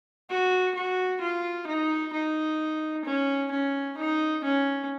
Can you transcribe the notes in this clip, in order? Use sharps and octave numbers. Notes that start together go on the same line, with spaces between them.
F#4
F#4
F4
D#4
D#4
C#4
C#4
D#4
C#4